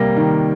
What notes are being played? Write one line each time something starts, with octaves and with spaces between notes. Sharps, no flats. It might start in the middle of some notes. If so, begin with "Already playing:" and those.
Already playing: C3 G3 A#3 A#6
D#3